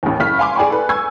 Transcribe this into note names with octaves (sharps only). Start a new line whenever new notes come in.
A1 D#2
F#1 B5 F6 B6
F5 G#5 C6 D6
G#4 D5 G5 G#5 B5 C#6
A4 B4
G#5 C#6 E6 G#6